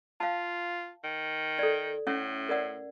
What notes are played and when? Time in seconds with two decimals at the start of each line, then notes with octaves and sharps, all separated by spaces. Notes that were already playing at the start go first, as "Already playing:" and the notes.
0.20 F4 F5 A5
1.04 D#3
1.59 A4 D5
2.07 A2 C#4 E5 F#5
2.49 A#4 D5 F#5